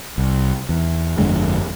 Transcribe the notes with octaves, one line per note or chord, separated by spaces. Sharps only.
C2
E2
G1 F2 D3 G#3